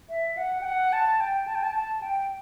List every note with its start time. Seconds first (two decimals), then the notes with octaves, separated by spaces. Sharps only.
0.10 E5
0.37 F#5
0.61 G5
0.65 F#5
0.93 A5
1.20 G5
1.47 A5
1.55 G5
1.63 A5
1.75 A5
2.02 G5